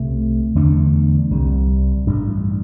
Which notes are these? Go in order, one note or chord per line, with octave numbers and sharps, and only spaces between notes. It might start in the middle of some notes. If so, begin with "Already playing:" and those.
Already playing: C2 C3 A3
E2 D3 A3 D4
C2 C3 G3
A1 G2 G3 D4